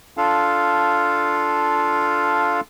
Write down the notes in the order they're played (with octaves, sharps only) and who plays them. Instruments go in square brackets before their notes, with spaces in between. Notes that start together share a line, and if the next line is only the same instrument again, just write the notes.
[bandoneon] D4 F4 A4 F5